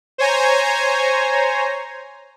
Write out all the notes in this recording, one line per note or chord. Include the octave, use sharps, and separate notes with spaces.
C5 C#5 G#5 A#5